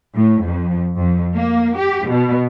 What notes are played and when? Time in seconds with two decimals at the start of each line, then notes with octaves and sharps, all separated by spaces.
0.14 A2
0.44 F2
0.96 F2
1.35 A#3
1.77 G4
2.08 B2